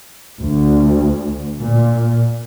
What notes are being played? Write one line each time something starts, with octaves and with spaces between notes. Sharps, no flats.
D2
A#2